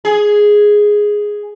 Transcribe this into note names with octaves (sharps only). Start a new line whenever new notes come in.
G#4